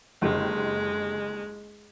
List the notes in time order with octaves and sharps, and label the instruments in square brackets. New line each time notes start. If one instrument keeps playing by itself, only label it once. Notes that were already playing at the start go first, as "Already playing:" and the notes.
[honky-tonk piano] F#1 D3 G4 [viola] G#3